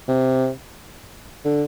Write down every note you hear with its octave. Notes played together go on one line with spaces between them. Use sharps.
C3
D3